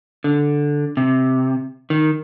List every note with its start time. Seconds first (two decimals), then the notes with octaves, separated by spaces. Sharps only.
0.24 D3
0.97 C3
1.90 D#3